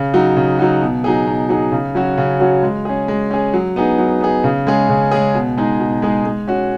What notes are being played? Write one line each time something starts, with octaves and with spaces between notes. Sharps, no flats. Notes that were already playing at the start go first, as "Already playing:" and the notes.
Already playing: C#3
F#3 D#4 F#4
C#3
F#3 D#4 F#4
B2
F#3 D#4 G#4
B2
F#3 D#4 G#4
C#3
F#3 C#4 F#4
C#3
F#3 C#4 F#4
G#3
C#4 G#4
G#3
C#4 G#4
F#3
B3 D#4 G#4
F#3
B3 D#4 G#4
C#3
G#3 C#4 G#4
C#3
G#3 C#4 G#4
B2
G#3 D#4 G#4
B2
G#3 D#4 G#4
G#3
C#4 F#4